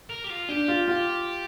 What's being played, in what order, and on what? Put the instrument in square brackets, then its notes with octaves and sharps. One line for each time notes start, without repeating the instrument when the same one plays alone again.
[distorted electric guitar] A#4
G4
F4
[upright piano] D4 [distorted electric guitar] G4
[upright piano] F4
F4